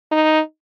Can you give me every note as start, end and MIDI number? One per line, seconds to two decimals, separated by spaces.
0.11 0.40 63